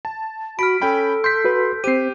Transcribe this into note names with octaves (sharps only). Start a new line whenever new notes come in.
A5
F#4 B5 F6 B6 D7
C#4 A4 G5 B5
C6 G6 B6
F#4 B4
C4 G4 C5 C7 D#7